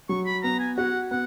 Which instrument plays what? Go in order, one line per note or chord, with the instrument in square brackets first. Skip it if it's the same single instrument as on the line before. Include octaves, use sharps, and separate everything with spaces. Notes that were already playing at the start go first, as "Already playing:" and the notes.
[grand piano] F#3 [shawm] C#6
[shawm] B5
[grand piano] B3 [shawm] A#5
[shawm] G#5
[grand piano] F#4 [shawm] F#5
[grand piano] B3 [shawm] F#5